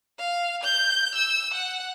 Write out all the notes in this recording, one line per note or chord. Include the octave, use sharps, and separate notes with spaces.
F5
G6
E6
F#5